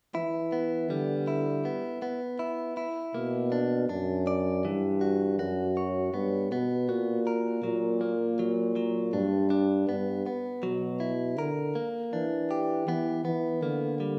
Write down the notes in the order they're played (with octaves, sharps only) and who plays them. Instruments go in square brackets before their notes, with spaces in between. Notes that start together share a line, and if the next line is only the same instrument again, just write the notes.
[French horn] E3 [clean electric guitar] E4
[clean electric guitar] B3
[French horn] D3 [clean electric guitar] G3
[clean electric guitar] E4
B3
B3
E4
E4
[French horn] B2 [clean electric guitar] A#3
[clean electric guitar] D4
[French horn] F#2 [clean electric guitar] D4
[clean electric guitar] D5
[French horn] G2 [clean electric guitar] E3
[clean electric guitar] F#4
[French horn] F#2 [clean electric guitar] F#4
[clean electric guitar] C#5
[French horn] G2 [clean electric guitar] B3
[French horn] B2 [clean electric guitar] B3
[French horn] A#2 [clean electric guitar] F#4
[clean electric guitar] A#4
[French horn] A#2 [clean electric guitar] F#3
[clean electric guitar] A#3
F#3
F#3
[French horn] G2 [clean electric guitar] D4
[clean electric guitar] D4
[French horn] G2 [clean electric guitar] B3
[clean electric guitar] B3
[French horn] B2 [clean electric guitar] F#3
[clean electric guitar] E4
[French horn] D3 [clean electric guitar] A#4
[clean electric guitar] A#3
[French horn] E3 [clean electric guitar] D4
[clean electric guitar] G4
[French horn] E3 [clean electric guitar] B3
[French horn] E3 [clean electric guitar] B3
[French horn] D3 [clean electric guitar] A#3
[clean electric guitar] G3